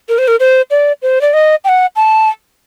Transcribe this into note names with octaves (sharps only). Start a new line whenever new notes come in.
A#4
C5
A#4
C5
D5
C5
D5
D#5
G5
F#5
A5